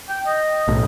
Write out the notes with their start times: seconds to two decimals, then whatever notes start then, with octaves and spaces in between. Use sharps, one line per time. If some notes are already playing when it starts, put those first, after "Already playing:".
0.09 G5
0.26 D#5
0.68 B1 A2